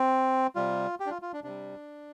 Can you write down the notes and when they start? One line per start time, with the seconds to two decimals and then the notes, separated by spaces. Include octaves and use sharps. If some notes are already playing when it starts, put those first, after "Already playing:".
Already playing: C4
0.55 C3 G3 F4
1.00 G4
1.06 D4
1.11 F4
1.22 F4
1.33 D4
1.44 C3 G3 D4